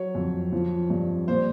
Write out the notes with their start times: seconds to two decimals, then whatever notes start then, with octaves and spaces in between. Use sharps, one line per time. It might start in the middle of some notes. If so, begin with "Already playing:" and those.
Already playing: F#3 C#5
0.15 F2
0.52 F3
0.90 G2
1.28 A#2 C5